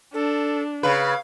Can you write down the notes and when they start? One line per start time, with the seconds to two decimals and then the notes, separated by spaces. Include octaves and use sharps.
0.14 D4 A4
0.83 C#3 B4 F5